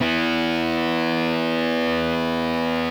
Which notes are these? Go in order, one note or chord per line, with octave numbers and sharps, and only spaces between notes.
B3 E4